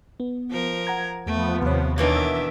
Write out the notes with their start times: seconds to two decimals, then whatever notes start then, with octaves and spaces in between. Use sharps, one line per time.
0.20 B3
0.50 F3 A#4
0.87 F#5 A#5 G#6
1.27 E2 F3 A3 B3
1.62 D#2 C3 C#5
1.98 B2 D#3 E3 A#3 D4 E5